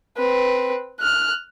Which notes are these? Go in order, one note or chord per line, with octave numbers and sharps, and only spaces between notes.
C4 B4
F6 F#6